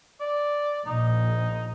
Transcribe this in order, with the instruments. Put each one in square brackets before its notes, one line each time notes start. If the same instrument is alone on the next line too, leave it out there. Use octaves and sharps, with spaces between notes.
[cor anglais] D5
[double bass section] A#1 [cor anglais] D#4